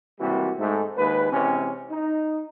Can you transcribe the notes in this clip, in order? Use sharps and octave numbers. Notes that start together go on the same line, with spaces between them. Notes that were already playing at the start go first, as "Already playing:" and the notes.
G#1 C3 E3 G3 A#3 F#4
G#2 A3
A#1 D#2 G#2 B4
G#2 C3 E3 C#4
D#4